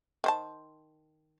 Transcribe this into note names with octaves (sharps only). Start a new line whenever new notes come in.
D#3 C5 A5